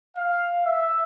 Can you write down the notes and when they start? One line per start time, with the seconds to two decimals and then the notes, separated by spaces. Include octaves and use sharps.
0.17 F5
0.64 E5